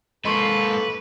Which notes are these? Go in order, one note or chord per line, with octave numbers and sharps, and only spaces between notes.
G#2 A#3 A4 B4 D#5 C6 C#6